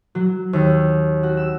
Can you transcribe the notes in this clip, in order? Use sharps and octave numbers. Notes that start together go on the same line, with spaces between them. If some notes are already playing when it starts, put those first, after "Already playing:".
F#3
D#2
F#4
E6